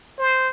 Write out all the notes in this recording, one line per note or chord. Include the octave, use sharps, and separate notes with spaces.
C5